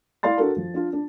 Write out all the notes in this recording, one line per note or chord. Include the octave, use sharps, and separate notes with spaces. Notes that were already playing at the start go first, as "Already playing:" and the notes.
E4 D5 F5 C6 A6
D4 F#4 A4 A#4
F3
D4 F4
D4